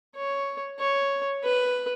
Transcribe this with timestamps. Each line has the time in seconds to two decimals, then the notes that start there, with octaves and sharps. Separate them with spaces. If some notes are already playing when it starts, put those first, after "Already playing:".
0.15 C#5
0.80 C#5
1.44 B4